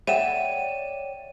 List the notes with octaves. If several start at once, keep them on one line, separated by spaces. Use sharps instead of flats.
C#5 D5 E5 F#5 G5 D#7 E7